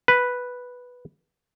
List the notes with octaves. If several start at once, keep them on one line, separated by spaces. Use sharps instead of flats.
B4